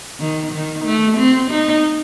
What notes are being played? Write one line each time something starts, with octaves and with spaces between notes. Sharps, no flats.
D#3
D#3
A3
C4
D#4